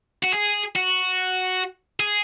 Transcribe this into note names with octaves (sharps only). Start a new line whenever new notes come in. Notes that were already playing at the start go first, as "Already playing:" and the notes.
F#4
G#4
F#4
G#4